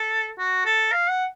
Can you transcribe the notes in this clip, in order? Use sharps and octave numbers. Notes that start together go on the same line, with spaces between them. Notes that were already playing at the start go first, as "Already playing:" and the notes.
Already playing: A4
F#4
A4
F5
F#5